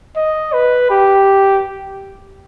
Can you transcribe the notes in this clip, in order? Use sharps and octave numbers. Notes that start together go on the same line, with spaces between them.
D#5
B4
G4